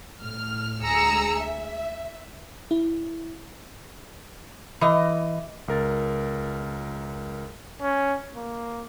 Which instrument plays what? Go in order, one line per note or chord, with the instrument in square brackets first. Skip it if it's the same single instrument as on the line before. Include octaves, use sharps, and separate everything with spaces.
[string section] A2 F6
D2 G#3 G#4 A#5 E6 C#7
E5
[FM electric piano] E4
[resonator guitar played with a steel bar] E3 D#5
[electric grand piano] C#2 A#4 A6
[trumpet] C#4
A#3